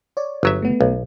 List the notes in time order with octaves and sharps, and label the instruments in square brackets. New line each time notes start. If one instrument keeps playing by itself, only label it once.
[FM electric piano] C#5 D5
[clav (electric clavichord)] G1 F#3 E5
[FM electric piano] A3 B3
[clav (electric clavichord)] B1